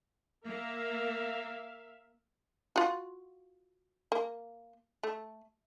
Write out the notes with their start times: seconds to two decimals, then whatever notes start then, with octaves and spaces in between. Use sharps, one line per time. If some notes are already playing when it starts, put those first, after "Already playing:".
0.46 A#3 A#4 E5 F5
2.76 F4 F#4
4.12 A#3
5.03 A3